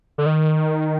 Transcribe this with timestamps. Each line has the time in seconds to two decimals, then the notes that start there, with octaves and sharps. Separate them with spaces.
0.18 D3
0.26 D#3